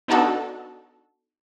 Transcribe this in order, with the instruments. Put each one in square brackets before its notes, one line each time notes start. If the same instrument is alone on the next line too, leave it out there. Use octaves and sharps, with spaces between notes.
[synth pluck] B3 D4 D#4 F#4 A4